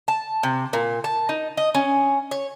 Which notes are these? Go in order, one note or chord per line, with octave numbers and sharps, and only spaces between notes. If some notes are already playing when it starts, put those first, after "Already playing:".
A5
C3
A#2
A5
D#4
D#5
C#4
C#5